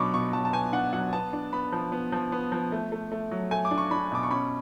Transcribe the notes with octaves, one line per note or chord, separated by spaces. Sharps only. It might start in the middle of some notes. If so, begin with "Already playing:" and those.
Already playing: B2 F#3 D4 B5 C#6 D6
B2 C#6
F#3 A5
A5
B3 G#5
D4 F#5
F#3 F#5
B3 A5
D4
B3 B5
F3
B3
F3
B3
F3
A3
A3
A3
F#3
A3 G#5
D6
D4
C#6
D4 B5
B2 D6
C#6
C#4 B5